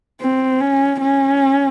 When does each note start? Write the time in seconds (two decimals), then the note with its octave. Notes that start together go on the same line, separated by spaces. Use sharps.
0.21 C4
0.61 C#4
1.01 C#4